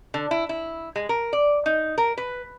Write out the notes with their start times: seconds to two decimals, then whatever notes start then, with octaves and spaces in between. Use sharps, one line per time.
0.14 D3
0.31 E4
0.49 E4
0.96 G#3
1.09 A#4
1.33 D5
1.66 D#4
1.98 A#4
2.18 B4